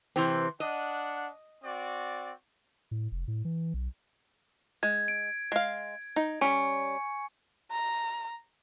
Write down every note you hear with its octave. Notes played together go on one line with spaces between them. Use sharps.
C3 E3 C4
D4 D#5 F#5
C4 F#4 D5
A2
F1
A2
E3
B1
G#3 G#6
D7
G#3 F5
D#4
G3 C#4 G#5 C#6 C#7
A#5